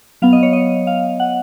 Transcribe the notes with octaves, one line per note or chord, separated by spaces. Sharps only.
F#3 B3 F5
D#5
C#5
D#5
F5
F#5